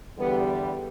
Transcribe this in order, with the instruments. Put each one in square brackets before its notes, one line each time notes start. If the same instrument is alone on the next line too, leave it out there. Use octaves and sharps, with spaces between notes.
[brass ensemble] E2 D3 G3 B3